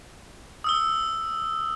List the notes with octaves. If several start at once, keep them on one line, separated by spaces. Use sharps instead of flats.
D#6 E6 G7